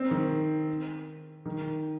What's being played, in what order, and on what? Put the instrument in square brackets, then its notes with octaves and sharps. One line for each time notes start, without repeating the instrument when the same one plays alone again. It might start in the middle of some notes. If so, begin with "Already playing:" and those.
Already playing: [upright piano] C4
D#3
D#3